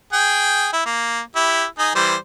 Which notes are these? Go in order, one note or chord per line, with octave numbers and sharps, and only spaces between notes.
G#4 G5
E4
A#3
E4 G4
D#4 G#4
E3 G3 C5